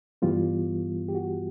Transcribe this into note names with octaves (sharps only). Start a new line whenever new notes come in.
G2 E3 G3 B3 F4
G4
F#4